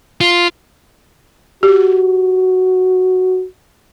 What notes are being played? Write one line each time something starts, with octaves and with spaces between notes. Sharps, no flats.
F4
F#4 G4